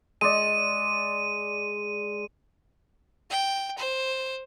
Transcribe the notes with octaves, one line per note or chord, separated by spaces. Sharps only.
G#3 D5 D#7
G5
C5